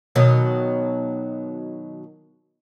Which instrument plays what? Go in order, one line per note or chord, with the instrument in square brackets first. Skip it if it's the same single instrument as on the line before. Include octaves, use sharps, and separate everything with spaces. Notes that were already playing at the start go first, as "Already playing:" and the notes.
[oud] B2 D#3 F#3